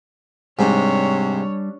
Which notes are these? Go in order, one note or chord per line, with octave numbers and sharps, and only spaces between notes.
G#2 C3 G3 D4 C#5